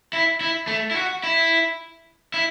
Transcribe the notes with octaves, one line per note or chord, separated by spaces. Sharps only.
E4
E4
A3
E4
F#4
E4
E4